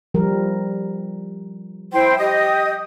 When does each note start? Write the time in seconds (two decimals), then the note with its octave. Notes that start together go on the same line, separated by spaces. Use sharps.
0.14 F3 G3 A#4
1.93 E4 C5 G5
2.18 G4 D#5 D#6